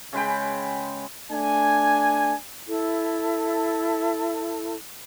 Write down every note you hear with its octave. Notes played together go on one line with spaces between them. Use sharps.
C#3 G#3 B4 G5
A3 D4 G#5
E4 A4